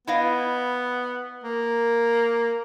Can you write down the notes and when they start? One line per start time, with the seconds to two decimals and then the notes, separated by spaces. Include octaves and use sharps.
0.07 B3 E4 D#5 F5
1.44 A#3